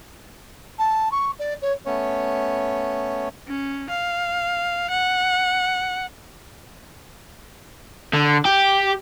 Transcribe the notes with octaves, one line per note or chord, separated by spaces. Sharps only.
A5
C#6
D5
C#5
A3 B3 C#4 C#5
C#4
F5
F#5
D3
G4